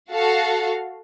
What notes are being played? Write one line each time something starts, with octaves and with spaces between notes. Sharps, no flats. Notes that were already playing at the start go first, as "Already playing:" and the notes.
F#4 A4 F5